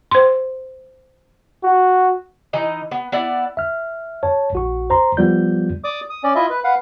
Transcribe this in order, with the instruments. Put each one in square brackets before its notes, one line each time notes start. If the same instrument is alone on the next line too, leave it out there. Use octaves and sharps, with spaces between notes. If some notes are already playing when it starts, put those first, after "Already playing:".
[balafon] C5 C6
[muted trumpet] F#4
[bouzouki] E3 D#4 A#5
B3
B3 E4 D5
[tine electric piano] E5 F6
C#5 A5
A#1 F#4 C#6
C5 A#5 C6
F3 G3 B3 F4 D5 G6
[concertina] D5 D6 D#6
D#6
C#4 D5
E4 F4 D#5 E5
B4
B4 F5 F#5